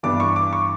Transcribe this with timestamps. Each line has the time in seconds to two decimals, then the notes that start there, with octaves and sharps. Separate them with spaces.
0.03 G2 E3 G3 B3 D4 D6
0.20 C#6
0.36 D6
0.53 C#6